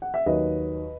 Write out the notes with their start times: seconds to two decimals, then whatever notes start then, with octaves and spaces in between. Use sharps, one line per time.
0.02 F#5
0.14 E5
0.26 D#2 D#3 F#3 B4 D#5